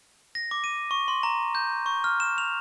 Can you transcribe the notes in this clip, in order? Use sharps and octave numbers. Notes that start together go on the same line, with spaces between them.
A#6
D6
D#7
C#6
C6
A#5
G6
C#6
F6
E7
F7